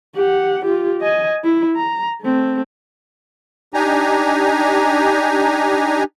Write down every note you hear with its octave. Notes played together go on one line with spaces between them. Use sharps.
G4 F#5
F4 G4
D#5 G#5
E4
A#5
A3 C4
D4 D#4 G4 G#5 A#5